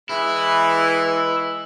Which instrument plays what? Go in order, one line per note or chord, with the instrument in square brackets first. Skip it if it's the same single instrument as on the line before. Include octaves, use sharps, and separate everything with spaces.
[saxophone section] E3 G#3 [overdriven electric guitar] E4